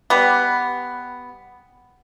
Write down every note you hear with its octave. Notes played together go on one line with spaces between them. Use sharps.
G3 B3